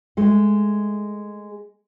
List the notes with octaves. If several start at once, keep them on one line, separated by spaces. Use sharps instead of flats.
G#3 A3